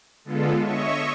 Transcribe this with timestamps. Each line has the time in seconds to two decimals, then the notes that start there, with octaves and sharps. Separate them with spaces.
0.25 D3 G#3 B3 F4 A4
0.62 C#5 D#5 E5 C#6